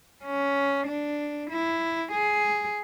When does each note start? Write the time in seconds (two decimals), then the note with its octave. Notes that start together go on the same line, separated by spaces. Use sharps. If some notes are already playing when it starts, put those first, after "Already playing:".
0.24 C#4
0.87 D4
1.50 E4
2.12 G#4